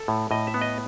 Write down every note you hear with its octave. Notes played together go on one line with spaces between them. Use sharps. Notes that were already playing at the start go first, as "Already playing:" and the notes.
Already playing: A4
A2
A2 D#5
E5
B3
D#5